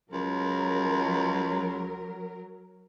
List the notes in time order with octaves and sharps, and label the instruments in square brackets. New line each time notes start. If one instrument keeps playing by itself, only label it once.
[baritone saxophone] C#2 [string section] F#3 A#4